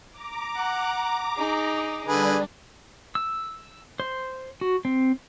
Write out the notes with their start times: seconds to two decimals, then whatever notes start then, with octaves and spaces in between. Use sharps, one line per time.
0.10 A#5 D6
0.56 F#5
1.36 D#4 G#4
2.08 D3 G3 D4 G#4 B4
3.15 E6
4.00 C5
4.61 F#4
4.85 C4